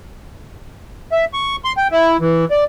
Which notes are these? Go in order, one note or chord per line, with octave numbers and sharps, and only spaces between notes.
E5
C#6
C6
G5
E4
E3
D5